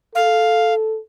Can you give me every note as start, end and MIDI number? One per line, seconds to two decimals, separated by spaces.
0.15 0.98 69
0.15 0.74 77